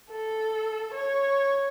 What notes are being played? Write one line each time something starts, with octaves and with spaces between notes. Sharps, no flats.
A4
C#5